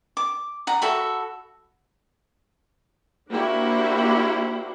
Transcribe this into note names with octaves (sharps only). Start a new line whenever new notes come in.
D6
F#5 A#5
F#4 A4 E5 B5
A#3 D4 E4 F#4 G4 C5